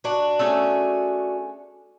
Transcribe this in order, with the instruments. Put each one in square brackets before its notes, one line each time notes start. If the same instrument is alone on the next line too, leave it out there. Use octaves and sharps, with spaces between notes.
[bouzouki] D4 F#4
[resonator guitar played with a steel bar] A3 C#4 G#4